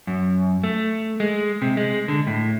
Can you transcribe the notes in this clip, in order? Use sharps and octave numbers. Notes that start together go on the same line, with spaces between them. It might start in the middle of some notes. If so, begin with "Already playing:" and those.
F#2
A3
G#3
C3
G#3
D3
A2